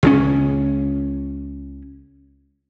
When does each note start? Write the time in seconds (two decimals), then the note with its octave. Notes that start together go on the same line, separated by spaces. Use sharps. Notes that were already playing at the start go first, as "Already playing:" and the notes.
0.03 C#2 C#3 C#4